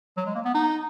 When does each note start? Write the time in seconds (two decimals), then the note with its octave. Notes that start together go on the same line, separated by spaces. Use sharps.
0.17 F#3
0.26 G#3
0.35 A#3
0.45 B3
0.54 D#4